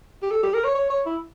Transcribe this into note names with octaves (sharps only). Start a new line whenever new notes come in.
G4
A4
G4
A#4
C#5
C#5
C#5
E4